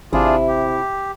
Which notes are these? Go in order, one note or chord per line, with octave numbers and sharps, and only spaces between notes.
G#1 C3 D4 E4 F4 G#4
G4